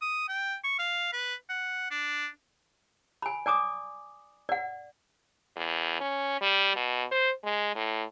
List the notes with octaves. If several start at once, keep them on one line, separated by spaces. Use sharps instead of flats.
D#6
G5
C#6
F5
B4
F#5
D4
G#5 B5
D5 G#5 D6 D#6
D5 F#5
E2
C#4
G3
B2
C5
G#3
A2